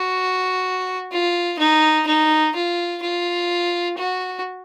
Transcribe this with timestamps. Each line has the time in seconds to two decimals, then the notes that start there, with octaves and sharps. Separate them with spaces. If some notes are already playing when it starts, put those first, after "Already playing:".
Already playing: F#4
1.12 F4
1.59 D#4
2.07 D#4
2.55 F4
3.02 F4
3.98 F#4